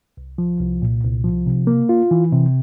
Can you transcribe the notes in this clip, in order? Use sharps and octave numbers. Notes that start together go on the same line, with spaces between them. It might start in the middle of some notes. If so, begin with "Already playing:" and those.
C2
F3
C2
A#2
C2
F3
C3
A#3
F4
E3
C3